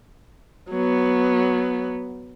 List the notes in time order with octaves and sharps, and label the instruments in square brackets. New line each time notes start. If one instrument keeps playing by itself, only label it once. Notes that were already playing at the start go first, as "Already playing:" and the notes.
[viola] F#3 B3